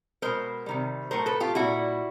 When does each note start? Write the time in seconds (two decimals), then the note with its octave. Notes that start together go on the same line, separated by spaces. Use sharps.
0.22 B2 G#3 A#4 C5
0.66 C3 D#3 G3
1.11 A2 F#3 A3 A#4 C5
1.26 A4 B4
1.40 F4 G4
1.55 A#2 G3 E4 F#4